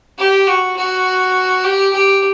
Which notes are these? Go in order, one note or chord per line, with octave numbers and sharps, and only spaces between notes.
G4
F#4
F#4
G4
G4